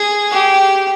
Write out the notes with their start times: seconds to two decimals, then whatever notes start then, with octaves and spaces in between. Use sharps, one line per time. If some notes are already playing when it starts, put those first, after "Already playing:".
Already playing: G#4
0.31 G4